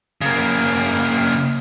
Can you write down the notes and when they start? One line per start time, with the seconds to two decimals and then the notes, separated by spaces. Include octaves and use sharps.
0.21 C#3 A#3